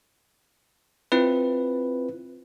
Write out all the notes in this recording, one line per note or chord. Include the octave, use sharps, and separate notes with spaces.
C4 E4 F4 B4